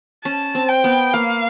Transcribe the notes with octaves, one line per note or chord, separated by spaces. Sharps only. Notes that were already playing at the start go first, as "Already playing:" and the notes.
C#4 A5
C4
G5
B3
A#3 F5